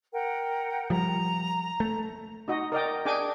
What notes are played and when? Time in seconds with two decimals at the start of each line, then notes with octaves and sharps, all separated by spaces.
0.13 A#4 F#5 G5
0.90 F3 G3 A#5
1.80 A3
2.48 D#4 F#4 D#5
2.72 A#4 D5 D#5 G5
3.05 D4 G#4 G5 G#5 D6